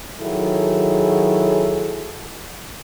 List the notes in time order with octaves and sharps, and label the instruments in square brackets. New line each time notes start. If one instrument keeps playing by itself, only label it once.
[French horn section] D#3 F#3 E4 G#4 A4